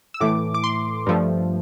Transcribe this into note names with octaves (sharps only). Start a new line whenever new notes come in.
E6
A2 E3 A3 D6
D6
C6
G2 F3 A3